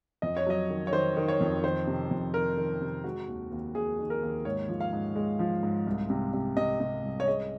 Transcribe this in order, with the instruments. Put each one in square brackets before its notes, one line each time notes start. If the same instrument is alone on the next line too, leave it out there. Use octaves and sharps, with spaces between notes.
[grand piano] F2 D#5
C#5
F#3 D#5
D#3
C#5
D#3 C5
D#3
C#5
F2
D#3 C5
C3
F2
D#3 A#4
D#3
C3
G#3 F#4
D#2
D#2
D#2 G#4
D#3
A#4
D#2
G#2 C#5
F3
F5
G#2
G#3
F3
G#2
C2
C3
C3
C3 D#5
C3
C2
C#5
G#3 D#5